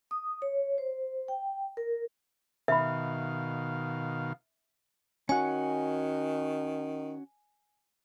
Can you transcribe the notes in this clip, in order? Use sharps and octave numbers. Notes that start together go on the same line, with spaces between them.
D#6
C#5
C5
G5
A#4
B2 D#3 E5 F5 B5
D#3 C#4 F#4 G#5